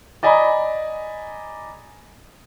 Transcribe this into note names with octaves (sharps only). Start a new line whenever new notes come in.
D5 D#5 G#5 A#5 B5 D#6